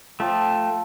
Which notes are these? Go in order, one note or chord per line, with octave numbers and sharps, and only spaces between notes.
F3 A3 G5